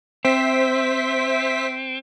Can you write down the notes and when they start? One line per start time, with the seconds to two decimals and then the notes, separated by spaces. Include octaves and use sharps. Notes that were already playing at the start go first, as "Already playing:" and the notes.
0.25 C4 C5 E5 B6